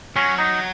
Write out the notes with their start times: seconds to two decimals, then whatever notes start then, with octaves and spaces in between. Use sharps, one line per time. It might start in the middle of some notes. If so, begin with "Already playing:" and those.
0.16 F#3 C#4
0.38 D#4